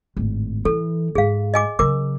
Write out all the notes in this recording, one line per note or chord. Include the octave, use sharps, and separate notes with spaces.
G#1 A2
E3 A4
G#2 G#3 G#4 F5
D#5 G#5 D6
C#3 F#3 A#4 D6